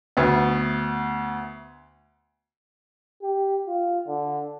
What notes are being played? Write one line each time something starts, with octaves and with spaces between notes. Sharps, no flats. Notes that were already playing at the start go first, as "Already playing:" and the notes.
D2 B3
G4
F4
D3